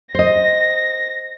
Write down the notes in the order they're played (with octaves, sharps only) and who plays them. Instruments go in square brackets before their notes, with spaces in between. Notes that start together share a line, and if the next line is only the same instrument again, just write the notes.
[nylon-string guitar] C5 D#5 [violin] A#6